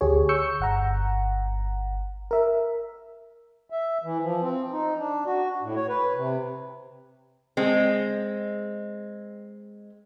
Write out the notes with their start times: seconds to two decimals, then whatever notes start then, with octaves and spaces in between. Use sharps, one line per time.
0.01 D2 G4 G#4 C#5
0.29 C#6 E6 G6 C#7
0.60 G1 F#5 A#5
2.31 A#4 E5
3.70 E5
4.04 E3
4.21 F3
4.42 C4
4.71 D#4
4.98 D4
5.26 F#4
5.63 A2
5.76 C#5
5.89 B4
6.15 C3
7.57 G#3 C4